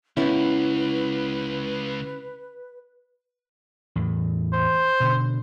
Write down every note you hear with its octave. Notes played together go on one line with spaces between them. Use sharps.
C#2 B3 C#4 E4 B4
E2 A2 E3
C5
B2 D3